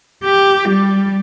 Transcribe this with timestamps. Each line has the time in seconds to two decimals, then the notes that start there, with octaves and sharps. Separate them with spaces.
0.24 G4
0.69 G3